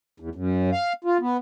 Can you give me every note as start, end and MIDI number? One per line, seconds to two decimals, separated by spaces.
0.20 0.29 40
0.35 0.70 42
0.72 0.93 77
1.04 1.17 65
1.21 1.37 59